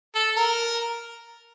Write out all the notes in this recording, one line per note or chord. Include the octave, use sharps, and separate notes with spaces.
A4
A#4